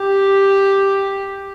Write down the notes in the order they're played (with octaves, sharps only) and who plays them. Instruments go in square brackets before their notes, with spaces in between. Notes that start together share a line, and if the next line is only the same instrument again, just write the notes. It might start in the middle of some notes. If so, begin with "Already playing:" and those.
Already playing: [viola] G4